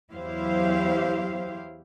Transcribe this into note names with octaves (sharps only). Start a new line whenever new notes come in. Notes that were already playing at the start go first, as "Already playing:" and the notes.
E2 F#3 E4 G4 C5 F5